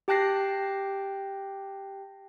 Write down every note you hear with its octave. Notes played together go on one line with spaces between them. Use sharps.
G4 G5 A5 F#6 A#6 C7